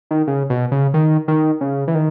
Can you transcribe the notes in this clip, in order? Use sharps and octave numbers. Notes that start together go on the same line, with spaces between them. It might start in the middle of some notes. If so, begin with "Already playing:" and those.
D#3
C#3
B2
C#3
D#3
D#3
C#3
E3
D#3